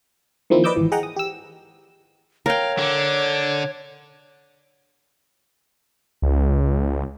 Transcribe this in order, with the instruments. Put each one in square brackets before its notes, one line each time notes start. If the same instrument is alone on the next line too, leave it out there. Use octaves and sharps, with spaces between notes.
[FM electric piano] D#3 F3 A#3 C4 E4
B4 D5 D#5 D6 E6 G6
G#1 E3
G#4 D#5 F#5 G5 A#5
D#6
G4 E6
[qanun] A#4 G5 [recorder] C#5 [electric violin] F5
[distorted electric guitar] D3 [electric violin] D6
[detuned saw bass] C#2